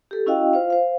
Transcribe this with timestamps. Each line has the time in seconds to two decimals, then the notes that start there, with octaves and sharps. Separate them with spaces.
0.11 G4 A4
0.26 C#4 E4 F#4 D#5 F5 G5
0.53 F4 C5 F5
0.70 C5 F5